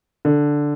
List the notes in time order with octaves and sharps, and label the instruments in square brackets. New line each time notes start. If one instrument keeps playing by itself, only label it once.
[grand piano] D3